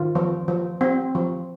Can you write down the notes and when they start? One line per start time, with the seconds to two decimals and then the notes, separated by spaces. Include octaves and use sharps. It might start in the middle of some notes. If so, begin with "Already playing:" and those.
Already playing: D#3 F4
0.15 F3
0.48 F3
0.81 C4
1.15 F3